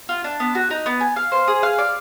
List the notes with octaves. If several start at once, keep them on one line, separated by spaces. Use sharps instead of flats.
F4
D4
B3
F#4
D#4
B3
G#5
F5
C5
G#4
F5
D5